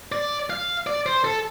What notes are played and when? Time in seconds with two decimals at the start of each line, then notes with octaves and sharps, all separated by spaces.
0.12 D5
0.50 F5
0.87 D5
1.06 C5
1.24 A4